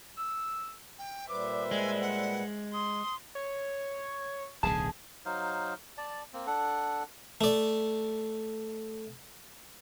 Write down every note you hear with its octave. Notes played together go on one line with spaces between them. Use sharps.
E6
G5
A#2 G3 B4 C5 E5 D6
G#3 G#5
F#5
C6 D#6
C#5
D1 B1 D3 G#4 A5
F#3 D#4 C5 F5
D5 A5
A#3 C4
D4 A4 F#5
A3 D5